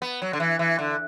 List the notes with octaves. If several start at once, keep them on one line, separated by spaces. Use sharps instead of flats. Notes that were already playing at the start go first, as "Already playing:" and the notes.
B3
F#3
D3
E3
E3
D3